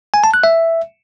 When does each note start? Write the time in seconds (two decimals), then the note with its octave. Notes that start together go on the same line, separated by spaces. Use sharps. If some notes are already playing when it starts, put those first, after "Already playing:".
0.14 G#5
0.24 A5
0.34 F#6
0.44 E5